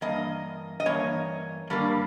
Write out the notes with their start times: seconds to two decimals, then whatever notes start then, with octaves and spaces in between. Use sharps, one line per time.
0.01 G2 E3 A#3 D#5
0.80 D#5
0.86 G2 E3 A#3 C#5
1.70 G2 G3 A#3